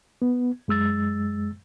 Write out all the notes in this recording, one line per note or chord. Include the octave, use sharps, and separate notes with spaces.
B3
F#2 G#3 E6 A6